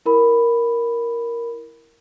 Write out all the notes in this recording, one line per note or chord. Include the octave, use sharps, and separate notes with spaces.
E4 A#4 B5